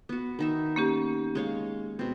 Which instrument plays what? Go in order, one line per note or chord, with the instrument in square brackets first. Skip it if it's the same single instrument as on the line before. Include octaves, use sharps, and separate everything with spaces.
[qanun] B3 F#4
D#3 D#4 E5
[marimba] A#3 C#4 G4
[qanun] G#3 C#5 F5
B2 C4